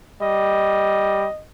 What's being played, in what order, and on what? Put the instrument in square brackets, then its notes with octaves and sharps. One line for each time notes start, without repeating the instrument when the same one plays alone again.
[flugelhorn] G3 [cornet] D#5